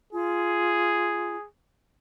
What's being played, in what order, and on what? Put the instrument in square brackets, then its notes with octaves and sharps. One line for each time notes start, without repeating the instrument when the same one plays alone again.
[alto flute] F4 [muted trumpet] G#4